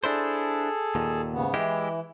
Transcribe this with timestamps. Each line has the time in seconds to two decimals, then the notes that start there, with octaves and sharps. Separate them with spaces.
0.04 D4 E4 G#4 A4 C5 A5
0.95 D#2 A#2
1.32 G#2 C#3 B3
1.54 E3 G#3 E4 G4